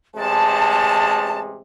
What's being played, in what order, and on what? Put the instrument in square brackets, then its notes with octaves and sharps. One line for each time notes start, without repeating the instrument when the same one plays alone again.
[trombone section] A1 C3 G#3 [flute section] A5